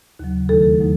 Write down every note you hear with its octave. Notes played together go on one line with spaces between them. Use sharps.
D#2 C#3 F#3
E2 D#3 F#3 A3 D#4 A4
D#3 F#3 A3 D#4